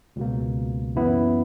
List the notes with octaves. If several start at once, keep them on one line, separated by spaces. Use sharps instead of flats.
C#2 B2 A#3
F#2 E3 B3 E4